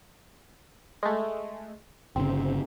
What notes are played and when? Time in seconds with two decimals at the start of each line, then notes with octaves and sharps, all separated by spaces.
1.03 G#3 A3
2.16 G1 C#3 C4